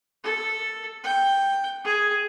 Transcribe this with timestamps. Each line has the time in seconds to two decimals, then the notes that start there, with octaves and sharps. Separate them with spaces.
0.24 A4
1.04 G5
1.85 G#4